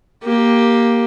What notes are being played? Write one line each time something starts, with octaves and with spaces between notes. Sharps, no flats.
A#3 G4